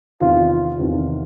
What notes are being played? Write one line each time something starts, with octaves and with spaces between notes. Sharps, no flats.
E2 C3 D#3 F4
E2 C3 D#3